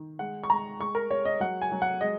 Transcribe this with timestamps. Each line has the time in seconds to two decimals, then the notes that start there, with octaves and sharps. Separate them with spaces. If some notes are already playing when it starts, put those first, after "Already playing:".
Already playing: D#3
0.19 G#3 F#5
0.43 C#6
0.50 G#3 A#5
0.80 G#3 C#6
0.95 A#4
1.10 G#3 C#5
1.25 D#5
1.40 F#3 F#5
1.62 G#5
1.72 F#3
1.82 F#5
2.01 G#3 D#5